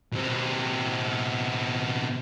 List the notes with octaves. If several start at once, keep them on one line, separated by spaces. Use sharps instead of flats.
B2 C4